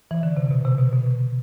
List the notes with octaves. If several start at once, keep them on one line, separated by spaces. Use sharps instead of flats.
E3
D3
C3
B2
C3
B2
B2